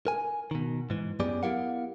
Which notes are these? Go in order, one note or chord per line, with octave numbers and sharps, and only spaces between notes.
A#4 G#5
B2 D#3
G#2 E3
F#2 B3 G4 G#4 D5
B3 E4 G4 A#4 F5 F#5